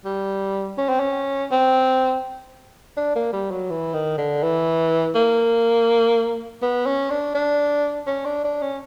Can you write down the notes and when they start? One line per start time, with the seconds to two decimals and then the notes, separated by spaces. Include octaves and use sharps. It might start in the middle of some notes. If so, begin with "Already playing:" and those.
0.05 G3
0.78 C#4
0.89 C4
1.00 C#4
1.52 C4
2.97 D4
3.16 A#3
3.33 G3
3.51 F#3
3.70 E3
3.94 D#3
4.18 D3
4.43 E3
5.15 A#3
6.62 B3
6.87 C#4
7.10 D4
7.35 D4
8.07 C#4
8.25 D4
8.45 D4
8.62 C#4